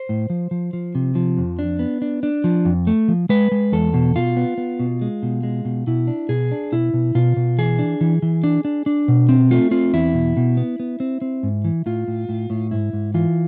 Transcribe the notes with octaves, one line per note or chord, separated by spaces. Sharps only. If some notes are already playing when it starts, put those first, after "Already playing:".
Already playing: C5
A2
F3
F3
F3
C3
F3
F2
D4
B3
D4
D4
F3
F2
A3
F3
G#3 B4
G#3
E2 A4
B2
B2 F4
B3
B3
B2
G#3
B2
G#3
B2
B2 E4
D4
B2 G#4
D4
B2 E4
B2
B2 F4
B2
E3 G#4
D4
E3
E3
D4
D4
D4
B2
C4
A3 F4
C4 F4
E2 E4
B2
B2
B3
B3
C4
C4
G#2
E3
A2 F4
A2
A2
A2
G#2 E4
G#2
E3 F4